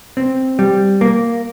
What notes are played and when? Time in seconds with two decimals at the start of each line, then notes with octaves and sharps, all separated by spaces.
0.17 C4
0.59 G3
1.01 A#3